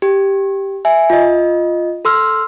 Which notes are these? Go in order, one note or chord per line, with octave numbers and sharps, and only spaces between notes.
G4
E5 G#5
F4 D#5
A4 C6 E6 F6